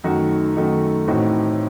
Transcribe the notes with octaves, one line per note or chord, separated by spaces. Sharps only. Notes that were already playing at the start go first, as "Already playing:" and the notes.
F#2 D#3 A3 D#4 F#4
F#2 D#3 A3 D#4 F#4
A2 E3 C4 D#4 F#4